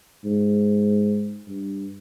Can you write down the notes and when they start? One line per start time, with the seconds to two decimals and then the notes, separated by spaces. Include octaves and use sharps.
0.25 G#2
1.48 G2